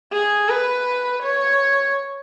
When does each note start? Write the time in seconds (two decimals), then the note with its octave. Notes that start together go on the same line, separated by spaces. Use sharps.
0.13 G#4
0.49 B4
1.23 C#5